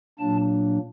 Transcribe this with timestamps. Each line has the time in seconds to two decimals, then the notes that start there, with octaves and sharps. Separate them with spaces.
0.19 A#2 F#3 A#3 D4 A5